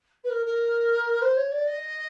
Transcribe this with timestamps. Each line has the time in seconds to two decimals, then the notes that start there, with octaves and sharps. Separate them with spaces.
0.24 B4
0.30 A#4
0.45 A#4
1.21 C5
1.36 C#5
1.51 D5
1.67 D#5